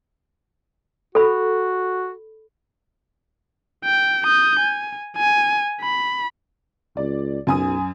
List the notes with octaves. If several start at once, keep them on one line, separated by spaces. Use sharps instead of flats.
F#4 A4 B5
G5
D#6 G6
G#5
G#5
B5
C#2 D5
B1 F#2 G#5 D#6